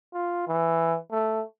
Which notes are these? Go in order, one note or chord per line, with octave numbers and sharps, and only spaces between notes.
F4
E3
A3